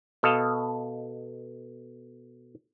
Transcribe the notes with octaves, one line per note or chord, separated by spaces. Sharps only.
B2 A4 D#5 F5